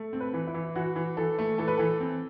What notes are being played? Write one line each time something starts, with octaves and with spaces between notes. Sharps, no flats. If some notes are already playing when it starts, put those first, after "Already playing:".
Already playing: A3
C4
B4
E3
E4
E3
E3 F#4
E3
E3 A4
A3
E3 A4
B4
E3 A4
C4